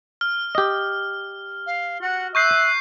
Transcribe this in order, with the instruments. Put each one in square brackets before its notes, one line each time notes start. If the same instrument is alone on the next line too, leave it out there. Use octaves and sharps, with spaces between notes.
[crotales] F6
[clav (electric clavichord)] G4 D#5
[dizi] F5
[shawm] F#4 [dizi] F#5
[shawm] E5 [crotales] C#6 G6 C7 [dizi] F#6